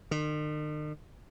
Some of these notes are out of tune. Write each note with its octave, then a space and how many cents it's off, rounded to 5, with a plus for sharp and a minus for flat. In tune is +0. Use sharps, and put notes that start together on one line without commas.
D#3 -45